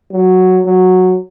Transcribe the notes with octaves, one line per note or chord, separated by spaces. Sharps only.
F#3
F#3